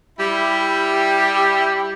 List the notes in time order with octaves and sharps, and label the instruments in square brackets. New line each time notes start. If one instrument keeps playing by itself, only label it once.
[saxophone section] G3 E4 G4